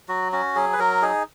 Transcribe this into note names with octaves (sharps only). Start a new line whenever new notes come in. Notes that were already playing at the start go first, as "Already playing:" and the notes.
F#3 F#4
C#4 F#4
F#3 G#4
B4
F#3 A#4
D#4 G#4